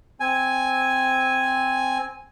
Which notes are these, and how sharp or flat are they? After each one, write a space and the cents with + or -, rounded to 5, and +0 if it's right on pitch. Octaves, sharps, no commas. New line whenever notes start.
C4 +0 G#5 +0